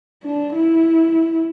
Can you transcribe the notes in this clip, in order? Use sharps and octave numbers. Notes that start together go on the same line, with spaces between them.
D4
E4